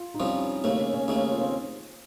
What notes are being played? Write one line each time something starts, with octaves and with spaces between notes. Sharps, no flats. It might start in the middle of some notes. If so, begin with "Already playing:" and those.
Already playing: F4
D#4
C2 C3 F3 C#4
D#2 C#3 A3 C4
C#4
C#4
D#2 C#3 A3 D#4
F4
C4